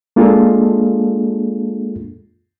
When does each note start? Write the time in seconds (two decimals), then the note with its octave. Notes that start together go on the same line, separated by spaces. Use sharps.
0.16 G#3 A#3 D4 F4 G#4 A4